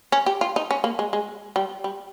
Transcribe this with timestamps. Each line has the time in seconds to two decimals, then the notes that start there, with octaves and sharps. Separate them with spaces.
0.12 C#4
0.26 G4
0.41 F4
0.56 D#4
0.71 C#4
0.84 A#3
0.99 G#3
1.13 G#3
1.56 G3
1.84 G3